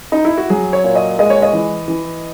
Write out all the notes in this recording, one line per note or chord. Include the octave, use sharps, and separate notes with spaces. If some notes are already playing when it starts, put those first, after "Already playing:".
D#4
E4
F#4
F#3 G#4
C#5
A#2
D#5
G#3 D#5
C#5
D#5
E3
E3